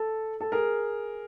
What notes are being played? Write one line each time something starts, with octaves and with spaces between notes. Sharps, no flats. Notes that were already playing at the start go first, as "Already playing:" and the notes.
Already playing: A4
A4
G#4 A#4